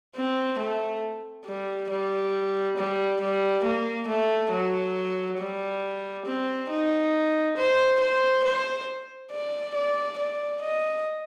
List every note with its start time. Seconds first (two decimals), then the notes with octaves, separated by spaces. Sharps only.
0.15 C4
0.59 A3
1.46 G3
1.90 G3
2.77 G3
3.21 G3
3.64 A#3
4.07 A3
4.52 F#3
5.39 G3
6.26 C4
6.69 D#4
7.57 C5
8.00 C5
8.44 C5
9.31 D5
9.75 D5
10.19 D5
10.62 D#5